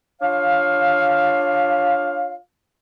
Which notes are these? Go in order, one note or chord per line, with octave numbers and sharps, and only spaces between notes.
D4 F4 C#5 F5